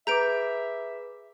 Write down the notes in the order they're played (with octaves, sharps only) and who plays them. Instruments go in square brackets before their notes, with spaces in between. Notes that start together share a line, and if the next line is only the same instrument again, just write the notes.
[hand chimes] G#4 B4 D6 [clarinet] E5 [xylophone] A#5 G6 D7